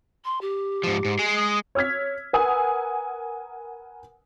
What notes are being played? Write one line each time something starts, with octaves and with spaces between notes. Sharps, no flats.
C6
G4
G#2 F3
G#2
G#3 G#4
D#6
C#5 E6 F6 G#6 B6
A#4 B4 F#5 G#5 D#6 E6